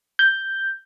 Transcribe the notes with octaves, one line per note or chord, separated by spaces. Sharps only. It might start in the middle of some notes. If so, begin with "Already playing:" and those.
G6